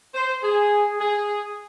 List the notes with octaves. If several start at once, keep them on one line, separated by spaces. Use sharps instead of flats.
C5
G#4
G#4